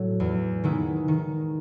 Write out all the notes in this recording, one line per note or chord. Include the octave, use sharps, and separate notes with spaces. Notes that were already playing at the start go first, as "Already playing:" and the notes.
Already playing: A2 F#3 A3
E2
D#3 G#3 B3 E4
D#3